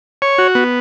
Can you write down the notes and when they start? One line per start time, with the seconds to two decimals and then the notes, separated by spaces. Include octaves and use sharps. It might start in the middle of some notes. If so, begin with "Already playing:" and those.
0.22 C#5
0.38 F#4
0.55 B3